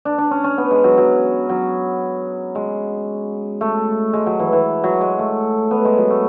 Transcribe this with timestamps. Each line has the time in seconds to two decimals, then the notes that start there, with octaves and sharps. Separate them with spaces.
0.05 D4
0.18 D4
0.31 C#4
0.44 C#4
0.58 B3
0.71 G#3
0.84 F#3
0.98 F#3
1.49 F#3
2.55 G#3
3.61 A3
4.13 G#3
4.26 F#3
4.39 E3
4.53 E3
4.84 F#3
5.01 G#3
5.19 A3
5.71 B3
5.85 G#3
5.98 F#3
6.10 A3